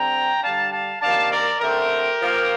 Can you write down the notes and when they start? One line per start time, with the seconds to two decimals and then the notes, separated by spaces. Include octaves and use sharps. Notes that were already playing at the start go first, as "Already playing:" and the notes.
Already playing: D3 G3 C4 G5 A#5
0.42 D3 G3 D4 F5 A5
0.72 F5 A5
1.01 C3 D#3 A#3 D4 F5 A5
1.32 A#4 D5
1.61 D3 A3 C4 G4 A#4
2.20 A#2 F3 A#3